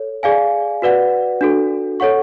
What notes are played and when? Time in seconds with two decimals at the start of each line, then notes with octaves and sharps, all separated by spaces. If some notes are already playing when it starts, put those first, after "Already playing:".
Already playing: A4 C#5
0.23 G#4 D5 F5 G#5
0.82 F#4 B4 D5 F#5
1.41 D4 F#4 A4
2.00 A4 C#5 F#5 C#6